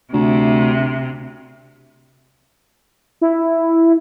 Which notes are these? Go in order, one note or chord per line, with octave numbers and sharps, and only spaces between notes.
D2 C3
E4